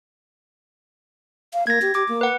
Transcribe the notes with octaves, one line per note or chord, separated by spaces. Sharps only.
F5
A#3 G#6 A#6
G4
G4 D6
A#3
B4 F#5